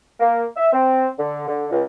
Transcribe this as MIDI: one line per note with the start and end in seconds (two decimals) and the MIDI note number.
0.20 0.43 58
0.56 0.71 76
0.73 1.07 60
1.18 1.46 50
1.47 1.66 50
1.71 1.83 37